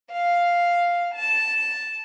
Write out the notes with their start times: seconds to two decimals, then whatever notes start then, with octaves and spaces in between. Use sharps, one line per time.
0.10 F5
1.14 A5